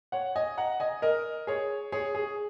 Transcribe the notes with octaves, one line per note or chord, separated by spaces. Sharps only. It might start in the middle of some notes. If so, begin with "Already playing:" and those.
C#5 F#5
D#5 G#5
F#5 A#5
D#5 G#5
A#4 D#5
G#4 C#5
G#4 C#5
G#4